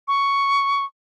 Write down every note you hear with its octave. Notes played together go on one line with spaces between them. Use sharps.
C#6